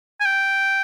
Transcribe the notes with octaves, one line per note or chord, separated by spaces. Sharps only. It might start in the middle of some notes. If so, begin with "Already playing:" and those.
G#5
G5